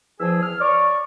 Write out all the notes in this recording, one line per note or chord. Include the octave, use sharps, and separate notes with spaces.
E2 F3 G#4 E6
F6
C#5 D5 C#6